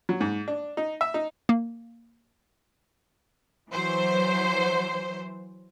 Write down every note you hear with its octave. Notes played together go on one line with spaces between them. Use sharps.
F#3
G#2
D4
D#4
E5
D#4
A#3
E3 F#3 C5